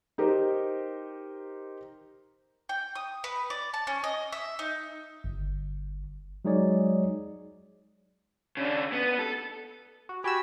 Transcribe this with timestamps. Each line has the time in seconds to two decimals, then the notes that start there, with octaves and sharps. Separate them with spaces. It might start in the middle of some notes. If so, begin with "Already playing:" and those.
0.18 D#4 G4 A#4 C5
2.69 G5
2.95 D#6
3.24 B4
3.50 D5
3.74 A5
3.87 C#4
4.04 D#5
4.32 E5
4.59 D#4
5.24 G1
6.45 F#3 G#3 D#4 G#4 C#5 D5
8.57 C#3 D4
8.92 B3
9.19 A4
10.09 F#4
10.24 F#4 G4 G#5 B5 E6